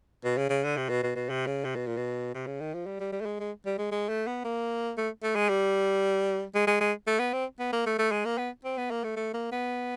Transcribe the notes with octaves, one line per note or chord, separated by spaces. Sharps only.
B2
C#3
C#3
D3
C3
B2
B2
B2
C3
C#3
C3
B2
A#2
B2
C3
C#3
D#3
F3
G3
G3
G3
A3
G#3
G#3
G3
G#3
G#3
A3
B3
A#3
A3
A3
G#3
G3
G#3
G#3
G#3
A3
B3
C4
B3
A#3
A3
A3
G#3
A#3
B3
C4
B3
A#3
A3
A3
A#3
B3